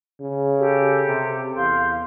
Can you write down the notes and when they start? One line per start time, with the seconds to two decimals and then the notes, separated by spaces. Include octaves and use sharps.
0.20 C#3
0.59 G4 A4
1.07 C3
1.56 E2 F5 C6 G6